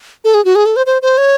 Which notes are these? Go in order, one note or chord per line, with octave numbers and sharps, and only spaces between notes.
A4
G#4
F#4
G#4
A4
C5
C5
C5
C#5